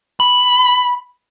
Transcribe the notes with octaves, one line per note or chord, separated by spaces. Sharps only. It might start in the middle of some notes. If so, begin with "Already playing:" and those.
B5